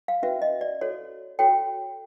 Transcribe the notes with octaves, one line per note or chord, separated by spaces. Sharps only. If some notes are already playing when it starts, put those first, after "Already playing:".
F5
C#4 F#4 B4 E5
D#5
D5
F#4 A4 C#5
F#4 A4 C#5 G5